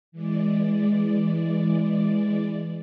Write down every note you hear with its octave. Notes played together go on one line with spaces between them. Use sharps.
E3 G#3 D5